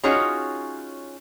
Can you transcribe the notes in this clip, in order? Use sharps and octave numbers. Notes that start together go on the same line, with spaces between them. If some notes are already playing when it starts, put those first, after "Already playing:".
C#4 D#4 F4 F#4 G#4 C#5